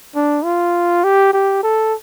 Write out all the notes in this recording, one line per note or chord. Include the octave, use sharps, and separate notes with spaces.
D4
F4
G4
G4
A4